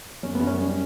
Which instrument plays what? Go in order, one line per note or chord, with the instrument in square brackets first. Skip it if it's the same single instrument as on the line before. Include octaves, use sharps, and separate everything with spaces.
[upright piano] F#2 [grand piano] C#4
[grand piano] B3
[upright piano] F#2
[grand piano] C#4
[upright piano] G3 [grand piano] C#4